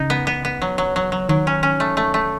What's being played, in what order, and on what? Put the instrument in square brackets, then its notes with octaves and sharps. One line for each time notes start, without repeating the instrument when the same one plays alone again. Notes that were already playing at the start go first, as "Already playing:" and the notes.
Already playing: [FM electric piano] C#3 [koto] D#4
[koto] B3
B3
B3
F#3
F#3
F#3
F#3
[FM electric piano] D#3 [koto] F#3
[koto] C#4
C#4
A3
A3
A3